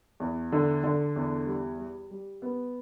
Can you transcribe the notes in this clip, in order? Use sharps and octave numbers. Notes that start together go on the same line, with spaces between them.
E2
D3
D3
E2
G3
G3
G3
B3